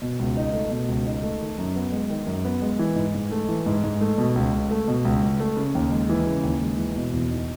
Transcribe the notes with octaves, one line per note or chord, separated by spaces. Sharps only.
B2
C#2
D#4
A3
B2
C#2
D#4
A3
D#3
F#2
B3
G#3
D#3
F#2
B3
G#3
E3
G#2
G#2
A3
E3
G#2
G#2
A3
B2
C#2
C#2
A3
B2
C#2
C#2
A3
C#3
D#2
G#3
E3
C#3
D#2
G#3
E3
B2
E2
D#4